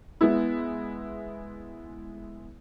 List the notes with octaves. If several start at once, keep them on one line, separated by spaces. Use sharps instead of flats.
G#3 B3 E4